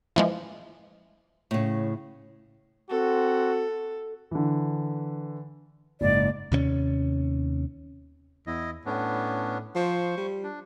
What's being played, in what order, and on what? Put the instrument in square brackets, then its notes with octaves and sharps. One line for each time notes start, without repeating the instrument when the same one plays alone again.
[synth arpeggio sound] E3 F3 G#3
[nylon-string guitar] A2 C#3
[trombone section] C4 F#4 [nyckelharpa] A4
[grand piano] D3 E3
[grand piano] F#1 G#2 [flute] D5
[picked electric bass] D#2 C3 B3 C#4
[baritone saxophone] E2 [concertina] E4 D#5
[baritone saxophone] A2 [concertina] B3 C#4 D4
[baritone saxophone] F3 [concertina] C5 C#6
[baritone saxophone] G3
[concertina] D4